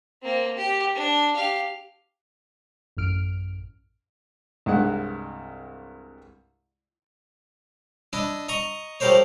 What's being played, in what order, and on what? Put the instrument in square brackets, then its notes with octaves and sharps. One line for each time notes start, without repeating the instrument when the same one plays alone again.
[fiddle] A#3 C4
G4
D4
G4 F5
[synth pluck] A1 F#2 A2 F6 D7
[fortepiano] C2 G2 G#3 F#5
[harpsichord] D4 E4 D#5
D#5 A#5 C#6 D#6
F3 G3 A3 A#4 C5 C#5